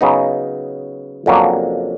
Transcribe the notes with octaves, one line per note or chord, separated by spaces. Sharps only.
C#3 F#3 B3 D#4
F2 C#3 F#3 A#3 D4